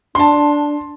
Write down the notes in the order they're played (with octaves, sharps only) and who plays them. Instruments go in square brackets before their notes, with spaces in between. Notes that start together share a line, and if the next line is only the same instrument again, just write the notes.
[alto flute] D4 [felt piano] A5 C6